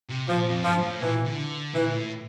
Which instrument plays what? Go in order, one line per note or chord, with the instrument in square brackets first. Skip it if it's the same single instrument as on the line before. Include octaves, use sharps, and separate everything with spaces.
[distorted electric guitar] C3
[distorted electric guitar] A#2 [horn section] F3
[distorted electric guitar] F2
[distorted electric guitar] G2 [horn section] F3
[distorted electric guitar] G2
A2
[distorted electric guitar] A#2 [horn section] E3
[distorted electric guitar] D3
[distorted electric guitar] A#2 [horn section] E3
[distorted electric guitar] A2